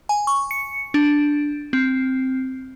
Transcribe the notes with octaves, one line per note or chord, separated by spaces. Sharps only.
G#5
C#6
C#7
D4
C4